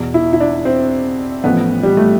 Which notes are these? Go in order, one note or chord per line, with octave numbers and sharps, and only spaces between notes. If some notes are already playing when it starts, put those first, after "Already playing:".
Already playing: E2 B2
E4
E4
D4
C4
A1 A2 F3 B3
G3
A3